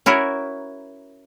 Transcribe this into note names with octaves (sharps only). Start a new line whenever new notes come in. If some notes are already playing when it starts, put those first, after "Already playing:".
C#4 E4 F#4 A#4